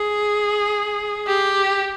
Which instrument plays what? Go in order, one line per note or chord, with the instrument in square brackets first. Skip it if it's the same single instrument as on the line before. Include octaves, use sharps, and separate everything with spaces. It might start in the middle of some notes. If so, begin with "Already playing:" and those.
Already playing: [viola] G#4
G4